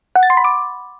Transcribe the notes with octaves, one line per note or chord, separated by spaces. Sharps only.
F#5
A6
C6
B5
D6